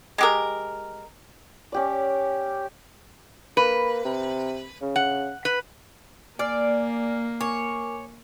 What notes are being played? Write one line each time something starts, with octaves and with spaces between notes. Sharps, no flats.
G#3 G4 A#4
C#4 G4 D5
A#3 B4
C3
C#3
F#5
B4
A#3 D5 G#5 F6 C7
A#4 C#5 G#5 D6